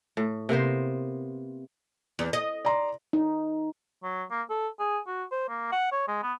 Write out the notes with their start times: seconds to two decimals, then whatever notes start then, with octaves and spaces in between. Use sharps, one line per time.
0.17 A2
0.49 C3 A#3 B3 C5
2.19 E2
2.33 D#5
2.65 D5 A#5 C6
3.13 D#4
4.03 F#3
4.30 A#3
4.50 A4
4.79 G#4
5.07 F#4
5.31 C5
5.48 A#3
5.72 F#5
5.91 C#5
6.08 G#3
6.22 B3